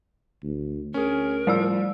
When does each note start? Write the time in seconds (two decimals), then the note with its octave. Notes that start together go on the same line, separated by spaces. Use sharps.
0.43 D2
0.94 D2 C#4 G#4 A#4
1.47 A2 F3 G3 D5 E6